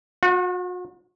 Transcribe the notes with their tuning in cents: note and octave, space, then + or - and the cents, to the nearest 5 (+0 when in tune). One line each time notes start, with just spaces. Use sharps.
F#4 -45 F#5 +0